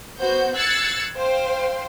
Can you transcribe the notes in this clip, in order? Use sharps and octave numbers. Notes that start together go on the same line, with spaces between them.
B3 F#4 C5 G6
E6 F#6 G#6 A6 C7 C#7
C5 F5 G5 C6